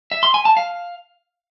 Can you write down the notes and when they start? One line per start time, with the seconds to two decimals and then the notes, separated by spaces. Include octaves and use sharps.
0.12 E5
0.23 C6
0.34 G#5
0.45 A5
0.57 F5